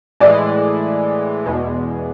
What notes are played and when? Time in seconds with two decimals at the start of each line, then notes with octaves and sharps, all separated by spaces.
0.20 A2 E3 G#3 D5
1.46 E2 B2 G#3